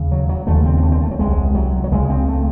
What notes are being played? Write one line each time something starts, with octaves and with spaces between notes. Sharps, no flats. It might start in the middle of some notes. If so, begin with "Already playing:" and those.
Already playing: D#2 C#3
F#3
F#3
D#2 C#3 A3
C4
C4
A3
C4
A3
F#3
C2 C3 G#3
F#3
F#3
C#2 C#3 G#3
C4
A3